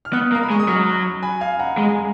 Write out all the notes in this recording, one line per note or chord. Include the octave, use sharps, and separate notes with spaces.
F6
B3 D#6 F#6
A#3
A#5
B5
G#3 C#6
D#6
F#3 C#6 F6
G#5 B5
F5 G#5
F#5 A#5
G#3 A#5
G#5